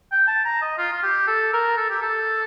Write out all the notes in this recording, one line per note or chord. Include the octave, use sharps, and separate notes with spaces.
G5
A5
A#5
D#5
F4
F4
G4
A4
A#4
A4
G4
A4